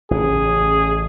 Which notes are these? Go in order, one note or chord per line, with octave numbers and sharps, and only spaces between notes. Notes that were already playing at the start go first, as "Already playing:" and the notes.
A1 C#3 G#4